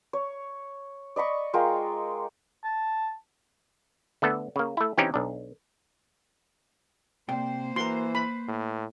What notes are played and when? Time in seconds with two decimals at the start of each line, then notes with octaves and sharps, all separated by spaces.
0.13 C#5
1.16 D5 D#5 B5 C#6
1.53 G#3 F4 A#4 G5
2.64 A5
4.22 D3 A3 B3 A4
4.56 C#3 A#3
4.77 A3 E4
4.98 E3 C4 C#4 D#4 G4
5.14 B1 D4
7.29 C3 A#3 C5 D5 G5
7.76 E3 F#4 A#4 C6
8.15 B4 B5
8.48 A2